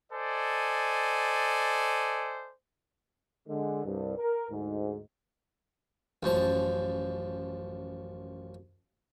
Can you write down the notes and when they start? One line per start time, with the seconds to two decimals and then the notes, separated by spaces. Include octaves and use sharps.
0.12 A4 C5 D5 D#5 G#5
3.48 D3 G#3
3.85 C2 G2
4.18 A#4
4.51 D2 G#2
6.23 A1 F#2 F3 A5